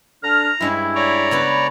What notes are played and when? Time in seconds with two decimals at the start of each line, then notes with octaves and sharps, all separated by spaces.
0.23 D3 D4 A#5 F6
0.60 G2 G#3 C#4 E4
0.95 C#5 D5 A#5
1.31 C#3 B3 B4